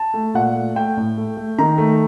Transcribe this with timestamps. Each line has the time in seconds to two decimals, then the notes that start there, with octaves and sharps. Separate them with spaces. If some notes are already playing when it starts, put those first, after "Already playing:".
Already playing: A5
0.14 A3
0.34 A#2 F#5
0.56 A3
0.75 A3 G5
0.97 A2
1.17 A3
1.37 A3
1.58 D#3 A#5
1.78 A3